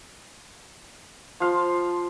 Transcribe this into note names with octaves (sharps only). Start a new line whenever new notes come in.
F3 F5 C6